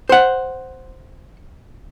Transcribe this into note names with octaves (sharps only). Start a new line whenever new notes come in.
C5 F#5